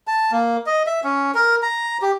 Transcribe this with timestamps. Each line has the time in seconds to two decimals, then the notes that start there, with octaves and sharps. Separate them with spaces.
0.07 A5
0.32 A#3
0.66 D#5
0.87 E5
1.04 C#4
1.35 A#4
1.62 A#5
2.02 G4